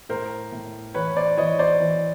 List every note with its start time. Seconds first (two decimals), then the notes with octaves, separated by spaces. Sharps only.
0.09 A2 A#4 C5
0.52 A2
0.94 E3 B4 C#5
1.16 C5 D5
1.37 E3 C#5 D#5
1.59 C5 D5
1.80 E3